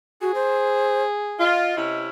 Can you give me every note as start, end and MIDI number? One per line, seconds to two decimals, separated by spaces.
0.22 0.32 66
0.22 1.57 68
0.35 1.03 72
1.39 1.72 65
1.39 1.97 75
1.76 2.09 48
1.76 2.09 61
1.76 2.09 64